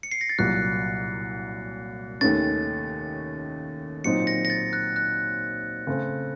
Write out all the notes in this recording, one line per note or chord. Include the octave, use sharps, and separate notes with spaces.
C#7
C7
A#6
A6
C2 A#2 F#3 F#6
D#2 D#3 A3 C#4 A6
A#2 F#3 C4 D#4 C#7
A#6
A#6
A6
F#6
F#6
C#3 A3 C4